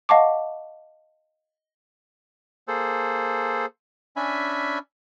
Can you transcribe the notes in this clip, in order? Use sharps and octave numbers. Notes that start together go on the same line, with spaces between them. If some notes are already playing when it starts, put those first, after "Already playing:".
D#5 F5 F#5 A5 C#6 D6
A#3 G#4 A4 C5
C#4 D4 E5 G#5 B5